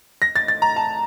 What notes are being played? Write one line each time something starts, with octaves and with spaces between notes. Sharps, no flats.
A#6
A6
A6
A#5
A5